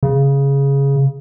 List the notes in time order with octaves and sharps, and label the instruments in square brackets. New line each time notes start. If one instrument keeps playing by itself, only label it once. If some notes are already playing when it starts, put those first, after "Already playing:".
[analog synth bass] C#3